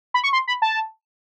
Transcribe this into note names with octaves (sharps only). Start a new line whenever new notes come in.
B5
C#6
C6
B5
A5